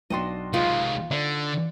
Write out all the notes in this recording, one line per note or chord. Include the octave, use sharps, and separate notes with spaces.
B1 D4 F#4 D#5 G5 C6
C3 G#3 D#4 F4 B4
D3 D5